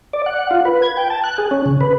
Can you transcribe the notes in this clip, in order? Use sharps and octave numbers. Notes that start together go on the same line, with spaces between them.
D5
F#5
F4
B4
G#6
G5
A5
F#6
G#4
C#4
C#3
B4